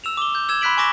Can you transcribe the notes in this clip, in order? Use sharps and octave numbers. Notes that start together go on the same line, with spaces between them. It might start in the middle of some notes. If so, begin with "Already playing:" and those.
E6 E7 F7
D6 G7
G6
E6 G#6 E7
B5 C6 F#6 B6 D7 F#7
G#5 C#6 D6 A#6 E7